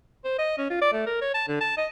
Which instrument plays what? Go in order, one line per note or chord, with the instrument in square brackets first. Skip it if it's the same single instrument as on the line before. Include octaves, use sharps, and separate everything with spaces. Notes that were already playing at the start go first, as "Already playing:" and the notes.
[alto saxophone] C5
D#5
C#4
F4
D5
A3
A#4
C#5
A5
D3
A5
D#5